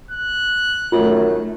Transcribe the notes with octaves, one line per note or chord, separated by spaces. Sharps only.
F#6
F#2 D#3 A3 F4